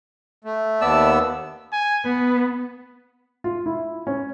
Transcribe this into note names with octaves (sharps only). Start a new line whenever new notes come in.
A3
D#2 B3 D5 E5 A5 E6
G#5
B3 B4
F4
E4
C#4